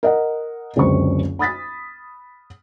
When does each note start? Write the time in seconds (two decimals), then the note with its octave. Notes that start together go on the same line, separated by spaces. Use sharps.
0.03 A#4 D#5 F#5
0.76 F#1 C#2 D3 C4 C5 C#6
1.39 B5 D#6 A6 B6